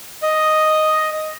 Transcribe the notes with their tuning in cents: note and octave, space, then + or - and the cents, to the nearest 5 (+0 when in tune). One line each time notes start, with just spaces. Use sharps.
D#5 +0